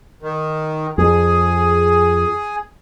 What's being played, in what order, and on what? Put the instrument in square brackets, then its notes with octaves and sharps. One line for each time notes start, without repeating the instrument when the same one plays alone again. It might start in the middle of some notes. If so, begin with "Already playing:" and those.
[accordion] D#3
[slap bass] F2 [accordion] G#4